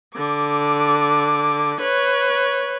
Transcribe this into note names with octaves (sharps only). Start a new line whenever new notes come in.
D3 D6
B4 C#5